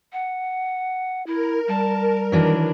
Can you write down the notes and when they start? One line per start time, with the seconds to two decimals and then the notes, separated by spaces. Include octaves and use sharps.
0.13 F#5
1.26 E4 A#4
1.68 G3 A5
2.32 D#3 E3 F#3 D4